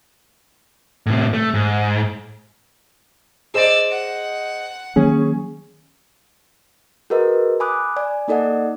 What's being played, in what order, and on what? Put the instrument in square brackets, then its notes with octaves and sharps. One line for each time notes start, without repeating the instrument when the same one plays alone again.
[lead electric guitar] A2 C3
A3
G#2
[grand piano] G#4 C5 D#5 [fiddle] D5 E6
[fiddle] F#5
[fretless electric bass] D#3 F#3 A#3 [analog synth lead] C#4 [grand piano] G#4
[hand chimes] F#4 G#4 A#4 B4 D#5
G#5 B5 D6 D#6 F#6
D5 G#5
A#3 D#4 A4 D5 D#5 F#5